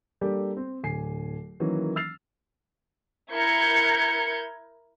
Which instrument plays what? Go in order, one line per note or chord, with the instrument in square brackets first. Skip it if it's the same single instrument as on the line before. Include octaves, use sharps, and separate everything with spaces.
[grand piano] G3 A#3 D4 G4 A4
C4
D1 G#5 C7
D#3 E3 F#3 A#3 C#4
E6 F6 A6 C7 F7
[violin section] E4 A#4 G6 G#6 C#7